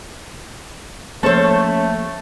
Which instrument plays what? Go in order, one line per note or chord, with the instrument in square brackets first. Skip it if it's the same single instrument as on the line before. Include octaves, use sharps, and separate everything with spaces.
[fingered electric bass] F3 A#3 [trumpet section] A3 [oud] C#4 C#5 [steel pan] A4 C5 A5